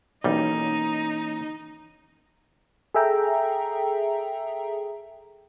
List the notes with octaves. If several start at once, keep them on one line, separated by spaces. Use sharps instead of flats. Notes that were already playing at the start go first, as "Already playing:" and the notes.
B1 E3 G3 A#3 C#4 D#4
G#4 A4 E5 G5 A#5